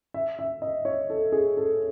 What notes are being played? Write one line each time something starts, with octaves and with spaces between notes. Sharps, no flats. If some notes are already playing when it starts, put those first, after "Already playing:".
E5
E5
D#5
C#5
A4
G#4
A4